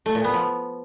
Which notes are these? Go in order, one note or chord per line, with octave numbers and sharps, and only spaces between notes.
A3
A#2
B3
F3